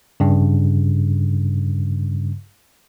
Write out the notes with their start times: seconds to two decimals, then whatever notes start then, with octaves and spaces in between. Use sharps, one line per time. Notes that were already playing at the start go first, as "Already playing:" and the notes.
0.20 G2 C#3